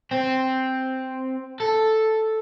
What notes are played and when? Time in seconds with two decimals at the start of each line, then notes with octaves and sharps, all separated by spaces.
0.11 C4
1.60 A4